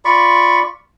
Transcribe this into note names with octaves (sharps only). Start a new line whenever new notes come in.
F4 D5 B5 C#6